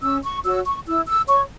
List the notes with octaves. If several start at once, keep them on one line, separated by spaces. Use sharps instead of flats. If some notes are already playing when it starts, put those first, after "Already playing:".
C#4 E6
C#6
F#4 C#5 E6
C#6
E4 E6
E6
C#5 C#6